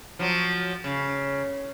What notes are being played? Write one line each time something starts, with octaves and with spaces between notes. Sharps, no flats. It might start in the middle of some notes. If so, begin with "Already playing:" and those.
F3 F#3
C#3